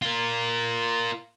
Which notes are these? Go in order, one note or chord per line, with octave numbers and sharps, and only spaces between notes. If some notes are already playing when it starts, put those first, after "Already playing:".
F4 A#4